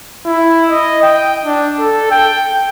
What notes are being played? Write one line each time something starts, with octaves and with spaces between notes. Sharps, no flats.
E4
D#5
G5
D4
A4
G5